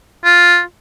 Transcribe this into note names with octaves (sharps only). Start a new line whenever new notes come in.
F4